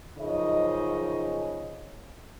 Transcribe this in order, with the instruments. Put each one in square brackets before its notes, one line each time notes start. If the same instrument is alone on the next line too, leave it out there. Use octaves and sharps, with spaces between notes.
[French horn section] F#2 C#3 F3 D#4 G#4 D#5